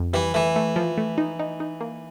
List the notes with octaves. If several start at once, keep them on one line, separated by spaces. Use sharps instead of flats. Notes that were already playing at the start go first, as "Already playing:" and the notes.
Already playing: F2
E3 G3
E3 A3
A3
F3
A3
D#4
D#4
D#4
A#3